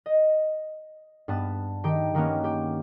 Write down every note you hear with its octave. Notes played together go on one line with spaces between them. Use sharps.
D#5
G2 B3 A5
D#3 G4 G5
D#3 A#3 B3 C#4
G4